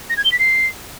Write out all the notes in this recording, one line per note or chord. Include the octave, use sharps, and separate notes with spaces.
A#6
G#6
G7
B6
C7